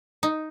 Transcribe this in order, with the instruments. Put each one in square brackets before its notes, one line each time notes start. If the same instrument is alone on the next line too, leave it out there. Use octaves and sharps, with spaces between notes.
[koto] D#4